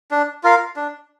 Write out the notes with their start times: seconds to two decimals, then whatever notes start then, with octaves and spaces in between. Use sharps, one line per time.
0.11 D4
0.43 F4 A#4 F5
0.76 D4